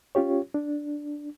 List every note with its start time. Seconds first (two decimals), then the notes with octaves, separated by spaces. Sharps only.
0.15 C#4 F4 G4 C#5
0.54 D4